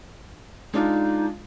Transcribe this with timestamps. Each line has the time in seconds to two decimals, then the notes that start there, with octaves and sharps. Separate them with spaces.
0.74 G#3 D4 D#4 F4